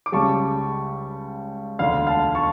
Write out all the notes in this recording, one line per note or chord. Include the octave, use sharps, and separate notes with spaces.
D6
C#2 C#3 G3 A5 C#6
E1 D2 D3 F5
F5 A5
A5 C#6